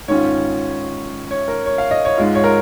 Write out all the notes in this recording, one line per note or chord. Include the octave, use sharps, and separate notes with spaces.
G#2 D#3 C#4 F4 C#5
C#5
A#4
C#5
F5
D#5
C#5
G#2 G#3 F4
C#5
A#4